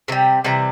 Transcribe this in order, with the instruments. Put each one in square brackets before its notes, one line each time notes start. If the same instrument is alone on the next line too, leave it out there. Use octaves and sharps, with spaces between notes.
[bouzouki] C3 E3
G3
C3 E3 G3 A#5